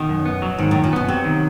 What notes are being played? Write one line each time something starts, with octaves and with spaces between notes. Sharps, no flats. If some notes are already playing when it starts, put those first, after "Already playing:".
Already playing: B2 D#3
F#2
B3
F#3
G#2 D#3
F#2 A2
A#2
B2 B3
C3 F#3
D#3